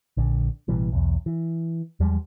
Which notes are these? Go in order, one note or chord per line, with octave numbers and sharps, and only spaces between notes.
A#1 D3
A1 B2 E3 G3
B1 E2
E3
E2 F3 G3 G#3